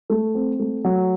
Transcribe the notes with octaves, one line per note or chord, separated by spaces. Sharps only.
A3
C4
A3
F#3